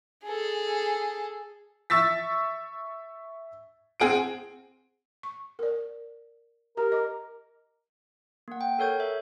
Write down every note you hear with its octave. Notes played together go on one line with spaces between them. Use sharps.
G#4 A4
E5 C#6 E6 A6 B6
C4 G#4 F#5 D7
C#6
A#4 D5
G4 A#4 A#5
D#5 D6
A#3 F#5
G5
A4 A#4 C#5 G6 G#6
E5